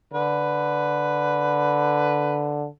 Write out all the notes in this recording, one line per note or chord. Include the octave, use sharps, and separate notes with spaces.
D3 B4